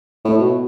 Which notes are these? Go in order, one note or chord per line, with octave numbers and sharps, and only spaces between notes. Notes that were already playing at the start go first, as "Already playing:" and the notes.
A2
B2